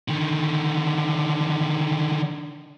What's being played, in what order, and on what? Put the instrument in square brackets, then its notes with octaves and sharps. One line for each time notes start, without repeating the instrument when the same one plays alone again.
[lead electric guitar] D3 D#3